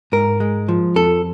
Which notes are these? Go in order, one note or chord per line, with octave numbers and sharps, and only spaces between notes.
G#2 A#4
G#3
F3
F2 A4